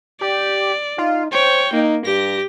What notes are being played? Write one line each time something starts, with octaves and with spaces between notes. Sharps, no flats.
G4 D5
D#4 F4
C5 C#5 G5
A#3 D#4
G2 G4 A#6